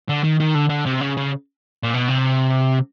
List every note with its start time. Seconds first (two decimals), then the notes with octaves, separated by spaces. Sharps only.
0.09 D3
0.24 D#3
0.40 D#3
0.55 D3
0.70 D3
0.86 C3
1.01 C#3
1.17 C#3
1.83 A#2
1.94 B2
2.09 C3